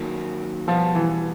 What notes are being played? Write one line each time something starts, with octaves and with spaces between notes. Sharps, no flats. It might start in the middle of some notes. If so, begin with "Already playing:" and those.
Already playing: D#3 F#3 A#3
B2 F3 G3 B3
E3